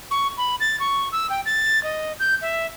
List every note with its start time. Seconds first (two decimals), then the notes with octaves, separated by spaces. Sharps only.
0.11 C#6
0.37 B5
0.60 A6
0.80 C#6
1.12 E6
1.30 G5
1.46 A6
1.84 D#5
2.20 G6
2.42 E5